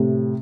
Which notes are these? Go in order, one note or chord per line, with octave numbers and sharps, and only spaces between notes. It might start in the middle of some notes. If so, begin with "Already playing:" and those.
Already playing: A2 C3